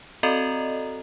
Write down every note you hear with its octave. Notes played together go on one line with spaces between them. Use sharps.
C4 F#4 A4 D5 D#5 A#5